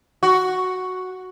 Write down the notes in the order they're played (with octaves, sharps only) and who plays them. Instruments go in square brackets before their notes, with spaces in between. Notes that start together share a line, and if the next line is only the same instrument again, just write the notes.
[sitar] F#4